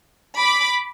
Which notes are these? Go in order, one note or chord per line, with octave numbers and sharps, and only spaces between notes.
B5 D6